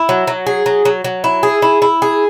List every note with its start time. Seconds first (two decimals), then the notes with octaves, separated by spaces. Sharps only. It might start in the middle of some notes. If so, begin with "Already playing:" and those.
Already playing: E4
0.09 F#3
0.27 F#3
0.47 G#4
0.66 F#3
0.85 F#3
1.04 F#3
1.24 E4
1.43 G#4
1.62 E4
1.82 E4
2.02 G#4